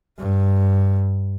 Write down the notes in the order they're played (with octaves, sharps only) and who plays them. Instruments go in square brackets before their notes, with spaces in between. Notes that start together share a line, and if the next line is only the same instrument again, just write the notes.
[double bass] G2